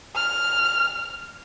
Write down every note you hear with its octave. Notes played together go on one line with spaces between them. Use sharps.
F6